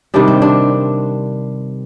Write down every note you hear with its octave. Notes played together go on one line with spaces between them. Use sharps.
C3 D#3 G3 D4
C4
D4